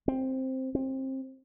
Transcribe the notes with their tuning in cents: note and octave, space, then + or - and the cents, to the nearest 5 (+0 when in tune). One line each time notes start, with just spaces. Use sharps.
C4 +5
C4 +25